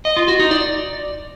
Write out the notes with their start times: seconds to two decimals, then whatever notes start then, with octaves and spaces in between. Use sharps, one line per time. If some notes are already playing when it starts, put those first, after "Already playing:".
0.05 D#5
0.17 F4
0.28 F#4
0.40 D#4
0.51 D5